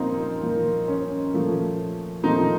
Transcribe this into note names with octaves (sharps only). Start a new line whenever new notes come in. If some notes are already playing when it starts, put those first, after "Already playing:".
Already playing: A#2 F3 A#3 C4 C#4 D#4 F4
A#2 F3 A#3
C#4
A#2 F3 A3
A#2 F3 A3 C4 D#4